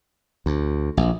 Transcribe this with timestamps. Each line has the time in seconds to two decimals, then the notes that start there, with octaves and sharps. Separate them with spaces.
0.46 D2
0.97 A#1